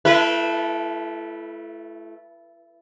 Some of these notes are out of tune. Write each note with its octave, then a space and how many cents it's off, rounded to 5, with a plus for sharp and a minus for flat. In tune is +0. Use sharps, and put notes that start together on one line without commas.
A3 -15 E4 +35 B4 -25